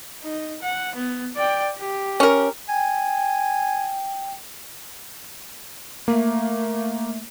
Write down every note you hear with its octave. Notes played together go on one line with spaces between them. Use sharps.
D#4
F#5
B3
D5 G5
G4
C#4 A#4
G5 G#5
A3 A#3